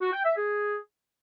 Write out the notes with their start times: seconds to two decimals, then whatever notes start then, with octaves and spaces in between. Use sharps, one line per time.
0.01 F#4
0.13 G5
0.25 E5
0.37 G#4